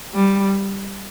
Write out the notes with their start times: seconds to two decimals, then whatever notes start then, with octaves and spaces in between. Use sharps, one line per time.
0.15 G3